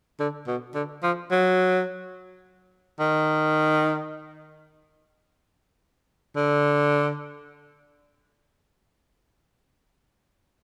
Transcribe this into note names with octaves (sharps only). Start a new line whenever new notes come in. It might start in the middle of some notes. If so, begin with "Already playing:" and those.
D3
B2
D3
F3
F#3
D#3
D3